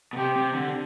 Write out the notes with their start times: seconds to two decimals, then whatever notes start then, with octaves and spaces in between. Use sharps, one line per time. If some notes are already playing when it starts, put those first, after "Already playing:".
0.13 B2
0.17 C3 G4
0.36 C3
0.55 D3